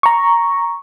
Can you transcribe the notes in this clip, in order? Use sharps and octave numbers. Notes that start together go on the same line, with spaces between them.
A#5 C#6